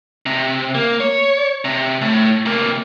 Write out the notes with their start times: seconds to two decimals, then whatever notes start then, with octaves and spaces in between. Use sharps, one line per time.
0.26 C3
0.75 A#3
1.00 C#5
1.65 C3
2.02 A2
2.46 C3 A#3